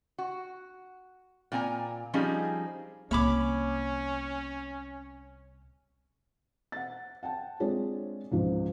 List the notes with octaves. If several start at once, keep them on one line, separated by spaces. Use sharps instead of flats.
F#4
A#2 C4 G#5 A#5
F3 G3 C4 C#4 D#4 G#4
C2 A#3 C#4 C#5 B5 D6
F#5 A6
F#5 G5 A5
G#3 C4 D4 F4 G#4 C#5
C#2 G#2 F3